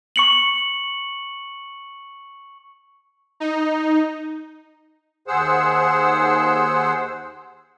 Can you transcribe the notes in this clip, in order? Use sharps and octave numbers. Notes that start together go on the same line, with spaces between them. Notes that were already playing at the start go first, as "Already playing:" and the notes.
C#6 C#7 F#7
D#4
D#2 G#4 C5 F#5 E6